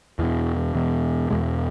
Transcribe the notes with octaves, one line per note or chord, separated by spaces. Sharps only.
E2 B2 E3
E2 B2
E2 B2 G#3